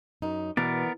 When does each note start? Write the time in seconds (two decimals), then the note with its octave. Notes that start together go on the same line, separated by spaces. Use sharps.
0.22 F#2 D#4
0.57 B2 E3 B3 A#4 D5